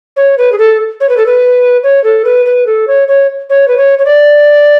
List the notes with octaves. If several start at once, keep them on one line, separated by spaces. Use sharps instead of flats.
C#5
B4
G#4
A4
C#5
B4
A4
B4
C#5
A4
B4
B4
A4
C#5
C#5
C#5
B4
C#5
C#5
D5